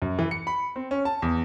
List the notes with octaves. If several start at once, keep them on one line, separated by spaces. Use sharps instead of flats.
F#2
E3
C#7
B5
C4
C#4
A5
E2